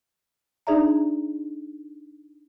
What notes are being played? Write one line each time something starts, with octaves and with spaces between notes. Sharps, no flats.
D4 D#4 G#4 D5 E5 A#5